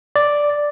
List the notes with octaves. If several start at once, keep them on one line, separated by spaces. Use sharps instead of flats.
D5